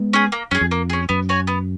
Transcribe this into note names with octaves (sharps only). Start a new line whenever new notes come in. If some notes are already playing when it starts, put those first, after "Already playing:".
Already playing: G#3 B3
C#4 G#4
A#3
F#2 C#4 G#4
F2
A#3
C#4 G#4
F#2 B3
F#4 C#5 G#5
B3